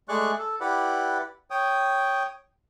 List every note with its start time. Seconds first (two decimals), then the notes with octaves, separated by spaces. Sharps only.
0.09 G#3 A3 G#4 D5 C#6 F#6
0.39 A4
0.61 E4 G4 B4 D5 F#5
1.51 C#5 G5 D#6